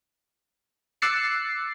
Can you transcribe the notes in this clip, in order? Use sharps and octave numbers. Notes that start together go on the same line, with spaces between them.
D6 E6 F#6 A6 C7 C#7